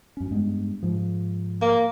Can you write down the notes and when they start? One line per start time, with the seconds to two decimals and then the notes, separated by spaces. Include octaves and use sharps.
0.17 F#2 C#4
0.31 G2 G#3 B3
0.83 G#2 F3
1.62 A#3